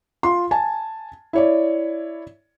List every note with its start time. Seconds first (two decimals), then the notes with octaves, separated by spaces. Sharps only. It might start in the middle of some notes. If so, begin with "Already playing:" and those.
0.23 F4 C6
0.51 G#5 A5
1.33 E4 C#5 D5